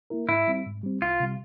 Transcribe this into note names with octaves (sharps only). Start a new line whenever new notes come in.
A#3 E4 A#4
G#2 E4
G3 C4
G#2
G3 C4
C2 F4
C3 G3